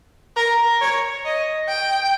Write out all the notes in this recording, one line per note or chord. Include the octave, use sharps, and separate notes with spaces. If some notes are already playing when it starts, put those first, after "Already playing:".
A#4
C#5
D#5
G5